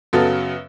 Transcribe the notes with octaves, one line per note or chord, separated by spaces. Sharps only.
F#2 C#3 F#3 B3 A4